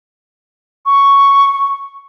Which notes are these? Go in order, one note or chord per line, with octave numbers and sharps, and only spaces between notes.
C#6